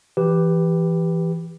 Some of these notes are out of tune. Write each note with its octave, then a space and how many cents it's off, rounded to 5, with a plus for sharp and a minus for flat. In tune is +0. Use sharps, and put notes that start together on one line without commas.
E3 +15 G4 +0 B4 +0